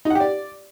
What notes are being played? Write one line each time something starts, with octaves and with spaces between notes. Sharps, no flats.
D#4
F#5
G4
D5